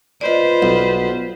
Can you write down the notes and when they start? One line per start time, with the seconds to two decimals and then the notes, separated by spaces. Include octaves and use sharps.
0.21 F4 B4 C5 D5 D#5
0.62 B1